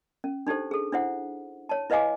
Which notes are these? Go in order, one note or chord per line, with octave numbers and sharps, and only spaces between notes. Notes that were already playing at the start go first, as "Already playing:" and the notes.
C#4
D4 D#4 G4 A4 C5
G#4 A4
D4 E4 C5 F#5
C#5 A5
E4 B4 D#5 F5 G#5 D6